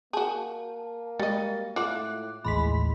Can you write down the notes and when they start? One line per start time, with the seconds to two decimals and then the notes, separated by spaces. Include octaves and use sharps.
0.13 A#3 F#4 G#4 A5
1.19 G3 G#3 D#5 A6
1.76 A2 F4 F#5 D6 F#6
2.45 A1 D#2 A2 G#3 B5 C6 B6